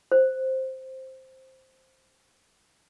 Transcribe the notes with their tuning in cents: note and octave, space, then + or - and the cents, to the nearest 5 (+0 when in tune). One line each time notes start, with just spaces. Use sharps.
C5 +5